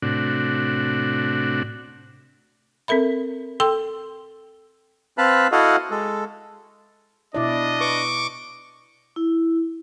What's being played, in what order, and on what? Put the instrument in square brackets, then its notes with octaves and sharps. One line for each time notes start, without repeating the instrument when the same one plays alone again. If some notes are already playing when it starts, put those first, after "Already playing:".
[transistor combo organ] A2 C3 D4 F#4
[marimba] C4 A4 A#4 E5 B5
A4 G5 C6 E6
[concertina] C4 B4 F5 A5 B5
E4 F#4 A4 D#5 F5 F#5
G#3 A4
[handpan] B2 E4 D5 [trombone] D4 [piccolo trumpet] D#5
[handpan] B4 [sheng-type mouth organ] C#6 D6
[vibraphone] E4